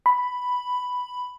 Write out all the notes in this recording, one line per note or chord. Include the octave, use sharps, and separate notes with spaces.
B5